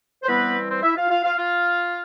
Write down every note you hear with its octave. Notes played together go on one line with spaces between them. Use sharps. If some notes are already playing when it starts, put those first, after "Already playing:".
C5
E3 G3 B3 C4 B4
C4 C5
E4 E5
F4 F5
F4 F5
F4 F5
F4 F5